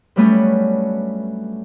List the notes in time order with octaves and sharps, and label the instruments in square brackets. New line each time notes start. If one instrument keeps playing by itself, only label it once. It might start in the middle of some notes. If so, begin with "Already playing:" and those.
[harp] G2 F#3 G3 A3 B3 C#4